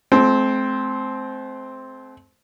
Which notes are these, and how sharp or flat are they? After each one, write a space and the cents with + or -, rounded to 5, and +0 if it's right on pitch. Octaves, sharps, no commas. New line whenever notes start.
A3 -40 C4 +0